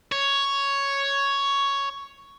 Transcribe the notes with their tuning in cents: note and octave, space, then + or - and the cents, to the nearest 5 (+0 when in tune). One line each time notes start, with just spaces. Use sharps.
C#5 +5